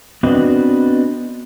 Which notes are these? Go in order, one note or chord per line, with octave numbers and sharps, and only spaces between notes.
B3 C4 D4 F#4 B4 D#5